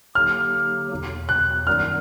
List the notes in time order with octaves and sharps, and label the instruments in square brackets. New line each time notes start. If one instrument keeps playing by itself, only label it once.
[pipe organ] D3 F#3 A#3 D#4 G4 [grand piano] F6
[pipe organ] E2 B2 F#3
[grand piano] F#6
[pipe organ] F#2 D#3 G3 B3 D#4 [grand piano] F6